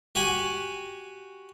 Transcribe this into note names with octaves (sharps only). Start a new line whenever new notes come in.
F#4 G4 F#5 G#5